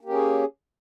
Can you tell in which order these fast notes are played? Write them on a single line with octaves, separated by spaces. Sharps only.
A#3 G4 C#4 G#4